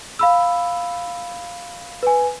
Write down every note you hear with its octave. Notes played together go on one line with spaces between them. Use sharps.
F5 B5 E6
B4 G#5